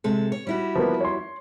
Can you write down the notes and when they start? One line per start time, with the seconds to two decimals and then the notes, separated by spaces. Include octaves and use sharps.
0.04 C3 G#3 A4
0.32 C#5
0.47 G3 E4 F#4
0.76 F3 A#3 B3
1.01 C#5 C6